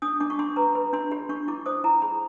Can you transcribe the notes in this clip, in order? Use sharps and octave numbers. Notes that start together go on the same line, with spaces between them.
D4 D#6
D4 D6
C#6
D4 C6
B4 A#5
B4 B5
D4 C6
G4 B5
D4 C#6
E4 D6
C5 D#6
E4 A#5
G#4 B5